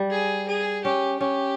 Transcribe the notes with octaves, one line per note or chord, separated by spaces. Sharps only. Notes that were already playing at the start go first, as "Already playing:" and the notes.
Already playing: G3
G#4
G#4
C#4 G4
C#4 G4